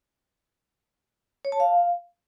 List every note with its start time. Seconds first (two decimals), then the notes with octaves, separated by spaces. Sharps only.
1.45 C#5
1.52 A5
1.60 F5